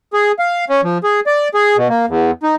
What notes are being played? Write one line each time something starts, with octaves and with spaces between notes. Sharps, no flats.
G#4
F5
C#4
F3
G#4
D5
G#4
B2
A#3
E2
D#4